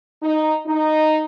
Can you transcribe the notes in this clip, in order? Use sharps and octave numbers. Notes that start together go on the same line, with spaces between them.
D#4
D#4